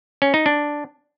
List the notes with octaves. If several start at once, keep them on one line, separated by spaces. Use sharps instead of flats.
C#4
D#4
D4